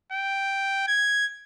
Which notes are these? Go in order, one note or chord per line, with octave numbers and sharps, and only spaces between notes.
G5
G#6